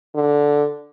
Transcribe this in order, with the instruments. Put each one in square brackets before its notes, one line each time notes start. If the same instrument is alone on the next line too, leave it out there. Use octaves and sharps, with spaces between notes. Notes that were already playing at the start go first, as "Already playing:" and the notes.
[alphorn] D3